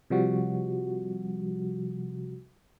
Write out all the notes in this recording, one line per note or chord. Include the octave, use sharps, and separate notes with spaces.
C3 F3 G3 F#4